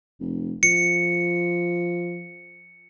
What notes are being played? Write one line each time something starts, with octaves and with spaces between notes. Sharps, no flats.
F1
F3 C#7